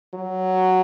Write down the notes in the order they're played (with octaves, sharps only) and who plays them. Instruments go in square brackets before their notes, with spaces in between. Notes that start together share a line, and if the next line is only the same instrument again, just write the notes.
[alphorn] F#3